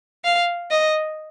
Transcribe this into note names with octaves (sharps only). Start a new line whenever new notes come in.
F5
D#5